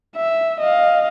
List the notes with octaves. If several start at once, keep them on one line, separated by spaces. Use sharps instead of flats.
E5
D#5 F5